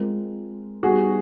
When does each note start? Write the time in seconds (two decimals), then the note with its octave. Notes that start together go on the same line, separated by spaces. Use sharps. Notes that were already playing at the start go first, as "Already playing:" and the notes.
Already playing: G#3 C4 F4 A#4
0.83 G3 B3 D#4 F#4 G#4